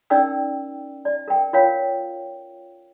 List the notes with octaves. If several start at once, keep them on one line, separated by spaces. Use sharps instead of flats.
C#4 D#4 A#4 D5 G5 E6
D5
A#4 G5
F4 A#4 C#5 F5 G5